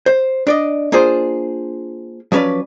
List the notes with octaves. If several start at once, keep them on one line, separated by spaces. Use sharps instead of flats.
C5
D4 D5 D#5
A#3 D4 F4 G#4 C5
F3 F#3 C#4 B4 D5